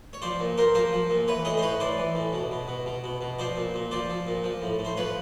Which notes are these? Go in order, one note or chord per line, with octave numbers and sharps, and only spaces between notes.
C#5
F3 C5 D5
A#2
A#2 A#4 C5
F3 A#4 C5
F3
A#2
E3 B4 C#5
A2 C#5 D#5
C5
A2 B4 C#5
E3 C5 D5
E3
A2
B2
B2
B2
B2
B2
B2
F3 C5 D5
A#2
A#2
F3 C5 D5
F3
A#2
F3
A2
A2
C5
F3 B4 C#5